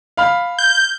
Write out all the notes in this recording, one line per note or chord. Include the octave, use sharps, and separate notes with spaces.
F5 B5 F6
G6